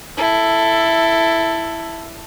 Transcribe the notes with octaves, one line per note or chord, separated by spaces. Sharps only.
E4 A4